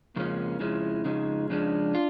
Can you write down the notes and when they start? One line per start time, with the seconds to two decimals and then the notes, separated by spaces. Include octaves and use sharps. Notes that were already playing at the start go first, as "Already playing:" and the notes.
0.15 F2 C#3 F3 G#3 A#3 C#4
0.60 F2 C#3 F3 G#3 C#4 E4
1.05 F2 C#3 F3 G#3 C#4 D#4
1.50 F2 C#3 F3 G#3 C#4 D4
1.95 F4